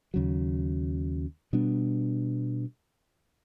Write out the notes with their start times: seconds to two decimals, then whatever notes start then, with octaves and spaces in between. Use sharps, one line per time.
0.14 D#2 C#3 F#3
1.53 B2 G3 B3 D4